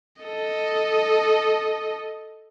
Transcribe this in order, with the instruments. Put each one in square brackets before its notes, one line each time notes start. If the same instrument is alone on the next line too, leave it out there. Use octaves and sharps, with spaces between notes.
[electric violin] A4 D#5